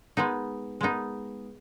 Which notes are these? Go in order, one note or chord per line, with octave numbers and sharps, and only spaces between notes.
G#3 B3 D#4
G#3 B3 D#4